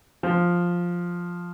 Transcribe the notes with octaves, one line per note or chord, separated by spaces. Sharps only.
F3